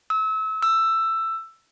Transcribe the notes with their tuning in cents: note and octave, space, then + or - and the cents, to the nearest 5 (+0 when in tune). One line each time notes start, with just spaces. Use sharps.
E6 -30
E6 +10